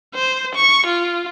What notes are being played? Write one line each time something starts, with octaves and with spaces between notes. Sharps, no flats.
C5
C#6
F4